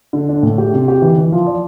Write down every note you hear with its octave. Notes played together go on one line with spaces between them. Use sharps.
D3
D4
A2
G4
C3
G4
E3
E3
F3
D5